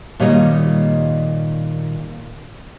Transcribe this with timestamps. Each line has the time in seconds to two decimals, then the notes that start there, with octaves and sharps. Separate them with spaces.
0.20 A#2 D#3 G3 C#5 D#5